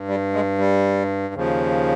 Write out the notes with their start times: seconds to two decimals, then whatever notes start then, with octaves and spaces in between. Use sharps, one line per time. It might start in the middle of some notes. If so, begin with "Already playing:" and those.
Already playing: G2
0.08 G3
0.33 G#3
0.58 G3
1.34 D#2 C#3 F3